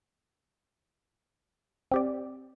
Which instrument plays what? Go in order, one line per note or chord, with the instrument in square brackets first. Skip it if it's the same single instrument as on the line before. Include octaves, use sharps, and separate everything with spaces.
[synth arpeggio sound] C4 G4 D5